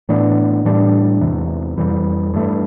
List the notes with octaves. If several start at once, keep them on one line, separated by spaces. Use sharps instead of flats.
A2 E3 B3 D4
A2 E3 G3 D4
E2 C3 E3
F2 E3 G3
G2 E3 A3